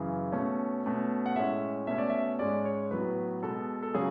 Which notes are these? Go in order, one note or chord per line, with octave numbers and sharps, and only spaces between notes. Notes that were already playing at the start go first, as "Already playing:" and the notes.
Already playing: F#2 C#3 E3 G#4
B2 A3 C#4
B2 A3 C#4
F#5
A2 G#3 C#4 E5
B2 A3 C#4 E5
D5
E5
G#2 G#3 C#4 D5
C#5
A2 F#3 B3 B4
B2 G#3 B3 A4
A4
C#3 F#3 C#4 G#4